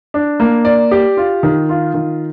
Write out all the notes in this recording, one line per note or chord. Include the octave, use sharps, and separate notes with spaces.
D4
A#3
D5
G4
F4
D#3
F4
D#3